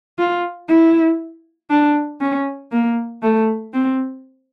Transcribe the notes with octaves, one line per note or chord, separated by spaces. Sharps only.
F4
E4
D4
C#4
A#3
A3
C4